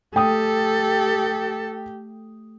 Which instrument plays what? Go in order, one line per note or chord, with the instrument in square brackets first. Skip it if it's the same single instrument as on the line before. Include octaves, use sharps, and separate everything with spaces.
[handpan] A3 [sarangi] G4 [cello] A4 [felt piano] G5 D#6